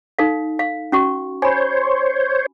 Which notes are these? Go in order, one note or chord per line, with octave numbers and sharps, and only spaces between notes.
D#4 A4 F5
F5
C#4 F#4 C#6
C5 C#5 G#5 B5